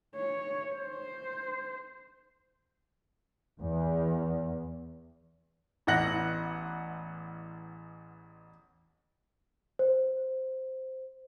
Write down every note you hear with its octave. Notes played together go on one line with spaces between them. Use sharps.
C#5
C5
E2
A1 E2 F#5 A#6 F#7
C5